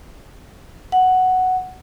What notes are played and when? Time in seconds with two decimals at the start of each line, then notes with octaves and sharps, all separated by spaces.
0.92 F#5